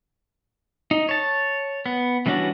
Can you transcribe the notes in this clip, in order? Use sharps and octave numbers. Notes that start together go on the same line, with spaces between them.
D#4
C#5 A5
B3
E3 G3 C#4 D4 F#4